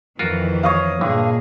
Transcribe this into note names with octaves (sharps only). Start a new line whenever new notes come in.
F2 D#3 E3 F4 F#4 A#4
C#5 D#5 F5
G2 A#2 D3 G#4